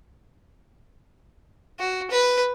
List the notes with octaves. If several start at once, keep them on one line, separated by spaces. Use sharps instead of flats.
F#4
B4